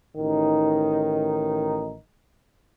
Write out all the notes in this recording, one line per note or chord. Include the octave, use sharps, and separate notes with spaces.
A1 D#3 D#4